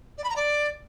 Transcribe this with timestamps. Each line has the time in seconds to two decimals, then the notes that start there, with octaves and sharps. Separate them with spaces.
0.18 D5
0.24 B5
0.30 A#5
0.36 D5